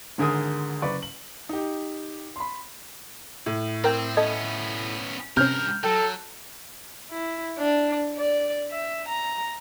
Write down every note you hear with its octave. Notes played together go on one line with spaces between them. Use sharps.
G#1 D3 G#4 A#4 D#6
F#1 B4 D5 C#6
F#7
D#4 G4
B5 C6
A2
C4 A#4 G5 G6
B3 C#4 A4 D#5 G#6
G2 C3 C#4 A#4 F6 G6
F#3 A4 G5
E4
D4
D5
E5
A#5